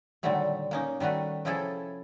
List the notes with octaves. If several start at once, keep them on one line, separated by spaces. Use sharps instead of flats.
A#2 D3 D#3 F#3 G3 A3
A#3 C#4 D#4
D#3 G3 A3 F#4 B4
C3 F3 C#4 E4 G#4 A4